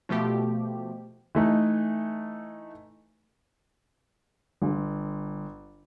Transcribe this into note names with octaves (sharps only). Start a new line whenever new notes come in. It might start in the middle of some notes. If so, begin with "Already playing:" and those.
B2 F3 A3 G4
E3 A3 D#4
G1